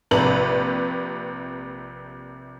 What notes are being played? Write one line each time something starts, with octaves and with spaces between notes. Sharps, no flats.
A#1 C3 B4 A#5 F#7